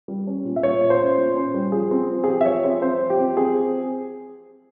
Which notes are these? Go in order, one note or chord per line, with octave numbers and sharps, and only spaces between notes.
G3
C#4
A#2
E5
A#2 C#5
A#2
C5
C#4
A#2
C#4
G3
F3 G#4
C4
F3
G#4
F3 G4
E5
F3 C#5
C4
C4 C5
F3
G4
C4
C4 G#4